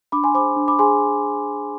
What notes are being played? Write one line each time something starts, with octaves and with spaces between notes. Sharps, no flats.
D4 B5 D6
G#5 C6
G#4 C5 B5 D6
D4
B5 D6
G#4 C5 G#5 C6